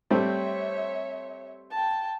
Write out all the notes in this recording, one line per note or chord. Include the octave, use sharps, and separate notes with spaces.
G3 A3 C4 C#5 E5
G5 A5